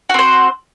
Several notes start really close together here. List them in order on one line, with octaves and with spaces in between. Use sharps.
F#4 C4 C5